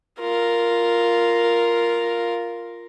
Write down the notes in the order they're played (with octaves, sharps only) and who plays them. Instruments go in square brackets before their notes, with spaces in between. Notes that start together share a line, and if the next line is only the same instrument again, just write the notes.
[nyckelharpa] F4 A#4